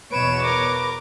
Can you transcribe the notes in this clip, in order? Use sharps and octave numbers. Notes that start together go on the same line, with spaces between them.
E2 B2 B4 C#5 D7 E7
A#4 D6